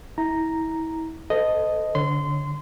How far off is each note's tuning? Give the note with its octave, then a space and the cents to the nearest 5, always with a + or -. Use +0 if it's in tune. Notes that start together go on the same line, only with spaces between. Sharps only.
E4 -30 A#5 +0
A4 +0 C5 -45 D#5 +0
D3 -20 C#5 +0 C6 -25